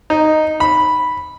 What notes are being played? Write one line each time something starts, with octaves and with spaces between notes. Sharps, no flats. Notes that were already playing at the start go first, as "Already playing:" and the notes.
D#4
B5